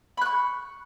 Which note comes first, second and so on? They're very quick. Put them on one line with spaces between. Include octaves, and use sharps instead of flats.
B5 F#6 C#6